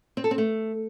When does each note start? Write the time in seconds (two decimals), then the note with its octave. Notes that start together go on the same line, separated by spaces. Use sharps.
0.17 C4
0.24 A4
0.31 C4
0.38 A3